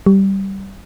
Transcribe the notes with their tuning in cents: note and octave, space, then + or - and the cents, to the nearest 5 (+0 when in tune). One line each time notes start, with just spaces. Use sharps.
G3 -15